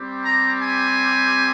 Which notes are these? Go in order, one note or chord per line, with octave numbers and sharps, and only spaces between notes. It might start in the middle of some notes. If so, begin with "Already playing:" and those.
Already playing: G3 C4 G4
A#5
G#5